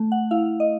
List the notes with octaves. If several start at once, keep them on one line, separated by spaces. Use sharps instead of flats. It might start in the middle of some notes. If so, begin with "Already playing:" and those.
Already playing: A3
F#5
E4 F5
D#5